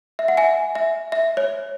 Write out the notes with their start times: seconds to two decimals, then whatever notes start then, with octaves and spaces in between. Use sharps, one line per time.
0.19 E5
0.28 F#5
0.37 E5 G#5
0.75 E5
1.12 E5
1.37 C#5